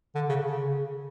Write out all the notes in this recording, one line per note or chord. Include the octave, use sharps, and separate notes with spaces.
D3
C#3
C#3